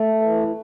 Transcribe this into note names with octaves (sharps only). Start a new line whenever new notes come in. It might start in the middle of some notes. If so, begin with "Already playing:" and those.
Already playing: A3
E3